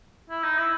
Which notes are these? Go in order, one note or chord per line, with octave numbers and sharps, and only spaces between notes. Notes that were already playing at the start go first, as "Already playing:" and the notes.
E4
D#4
E4